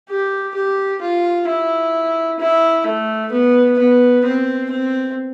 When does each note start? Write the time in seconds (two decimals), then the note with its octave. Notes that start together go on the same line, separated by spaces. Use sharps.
0.09 G4
0.55 G4
1.01 F4
1.47 E4
2.40 E4
2.86 A3
3.32 B3
3.79 B3
4.25 C4
4.70 C4